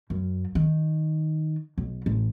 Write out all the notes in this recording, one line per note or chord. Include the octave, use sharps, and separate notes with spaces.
F#2
D#3
B1
A1